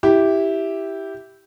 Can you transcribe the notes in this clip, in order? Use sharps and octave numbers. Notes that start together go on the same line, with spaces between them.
E4 G4